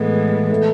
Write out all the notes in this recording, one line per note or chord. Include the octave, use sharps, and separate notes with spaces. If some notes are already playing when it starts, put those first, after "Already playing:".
Already playing: A2 E3 G#3 A3 B3
A3